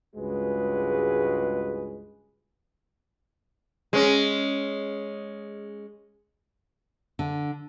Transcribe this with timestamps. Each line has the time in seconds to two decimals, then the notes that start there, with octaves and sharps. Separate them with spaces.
0.16 C#2 G2 G#3 F#4 G#4 B4
3.93 G#3 C#4
7.19 D3